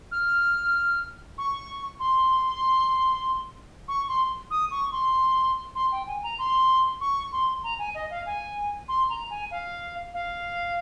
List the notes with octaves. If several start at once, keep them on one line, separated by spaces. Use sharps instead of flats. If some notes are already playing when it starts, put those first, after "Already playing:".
F6
C#6
C6
C#6
C6
D#6
C#6
C6
C6
G5
G#5
A#5
C6
C#6
C6
A#5
G#5
D#5
F5
G#5
C6
A#5
G#5
F5
F5